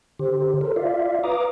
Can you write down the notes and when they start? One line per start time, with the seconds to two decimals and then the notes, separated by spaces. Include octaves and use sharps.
0.19 D3 G4 C5
0.61 A4 A#4 C5
0.76 F4 D5 E5 F5
1.24 B4 F5 A#5 D6 D#6